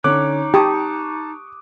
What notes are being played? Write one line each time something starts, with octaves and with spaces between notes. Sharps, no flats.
D3 C#4 D#4 C#5 D6 F#6
G4 A5 C#6 D#6